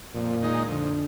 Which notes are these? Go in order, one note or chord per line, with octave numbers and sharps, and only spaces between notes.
F2 A#2
D#3 G#3 D#4
F2 D3